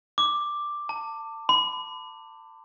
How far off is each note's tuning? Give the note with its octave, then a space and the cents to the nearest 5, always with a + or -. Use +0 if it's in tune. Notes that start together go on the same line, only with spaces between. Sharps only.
D6 +5
A5 +30
B5 +35